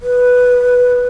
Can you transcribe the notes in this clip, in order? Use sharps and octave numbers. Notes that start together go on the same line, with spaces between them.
B4